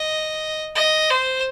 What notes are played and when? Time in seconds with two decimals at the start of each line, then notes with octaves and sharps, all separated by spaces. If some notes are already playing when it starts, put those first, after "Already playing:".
Already playing: D#5
0.75 D#5
1.10 C5